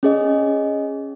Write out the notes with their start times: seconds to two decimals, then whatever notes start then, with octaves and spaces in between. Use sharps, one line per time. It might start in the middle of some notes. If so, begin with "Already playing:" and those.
0.03 C#4 G#4 D#5